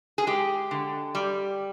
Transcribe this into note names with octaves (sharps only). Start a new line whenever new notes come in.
G#4
G#3 G4
D3
G3